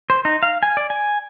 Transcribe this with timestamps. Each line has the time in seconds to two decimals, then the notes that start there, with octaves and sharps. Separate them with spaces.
0.10 C5
0.25 D#4
0.43 F5
0.63 G#5
0.77 D5
0.90 G#5